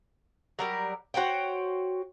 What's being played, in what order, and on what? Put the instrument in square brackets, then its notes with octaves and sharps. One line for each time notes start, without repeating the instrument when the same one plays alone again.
[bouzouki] F#3 G3 A#4
F#4 C5 C#5 G5